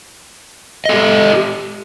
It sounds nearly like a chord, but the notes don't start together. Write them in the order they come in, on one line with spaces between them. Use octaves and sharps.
D#5 A4 G4